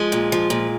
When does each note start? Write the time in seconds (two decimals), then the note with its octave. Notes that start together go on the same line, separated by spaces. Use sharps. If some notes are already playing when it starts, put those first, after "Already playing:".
Already playing: F3 G#3
0.12 A#2
0.32 F3
0.50 A#2